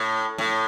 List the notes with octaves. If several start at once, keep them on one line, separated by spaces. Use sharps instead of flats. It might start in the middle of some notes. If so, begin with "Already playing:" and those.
Already playing: A2
A2